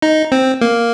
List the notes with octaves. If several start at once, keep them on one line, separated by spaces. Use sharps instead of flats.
D#4
C4
A#3